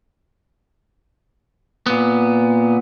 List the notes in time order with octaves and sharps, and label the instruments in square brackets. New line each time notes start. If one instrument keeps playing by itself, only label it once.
[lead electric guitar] A#2 B3